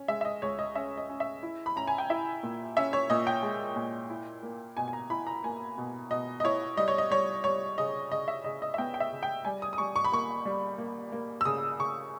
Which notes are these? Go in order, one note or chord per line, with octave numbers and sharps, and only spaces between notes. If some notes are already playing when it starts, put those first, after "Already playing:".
Already playing: C#4
G#3 E5
E5
D#5
C#2 C#5
D#5
C#4 E5
D#5
C#4
E5
E4
B5
C#4 A#5
G#5
G5
E4 E5
A#2
C#4 E5
C#5
A#2 D#5
G5
G#3
A#2
E4
A#3
B2 G#5
G#5
A#5
E4 B5
A#5
A#3 G#5
B2
B2 D#5
D#5
E4 C#5
G3 D#5
C#5
D#5
G3 C#5
G3 C#5
C#3 D#5
C#3 D#5
E5
C#3 D#5
D#5
E5
B3 G5
G5
E5
C#3
G5
G3 G#5
D#6
D#6
G3 C#6
C#6
B5
A#3 C#6
G3
A#3
A#3
E6
C#3 D#6
C#3 C#6